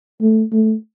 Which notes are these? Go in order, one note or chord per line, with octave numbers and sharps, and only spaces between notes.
A3
A3